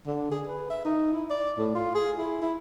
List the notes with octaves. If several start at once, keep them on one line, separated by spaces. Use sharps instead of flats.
D3
G#4
B4
E5
D#4
E4
D5
A2
F4
G#4
E4
E4